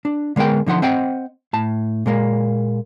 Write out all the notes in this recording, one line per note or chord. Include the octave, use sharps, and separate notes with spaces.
D4
D3 G#3 B3 A#4 G5
D3 F3 D#4 F#5 C6
C4 C5 D#5 F#5 G5
A2 A5
A#2 G#3 A#3